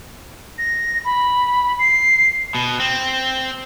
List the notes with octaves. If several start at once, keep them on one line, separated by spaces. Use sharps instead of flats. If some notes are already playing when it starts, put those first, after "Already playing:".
A#6
B5
C7
B2
C4